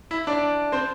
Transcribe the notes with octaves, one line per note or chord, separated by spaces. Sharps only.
E4 E5
D4 D5
C4 C5